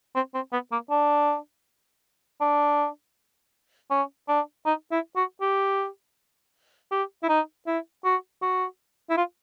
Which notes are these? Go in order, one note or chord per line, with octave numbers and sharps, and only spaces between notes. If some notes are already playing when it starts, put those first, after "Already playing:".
C4
C4
B3
A#3
D4
D4
C#4
D4
D#4
E4
F#4
G4
G4
E4
D#4
E4
F#4
F#4
E4
F4